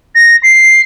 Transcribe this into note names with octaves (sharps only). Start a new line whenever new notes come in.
A#6
C7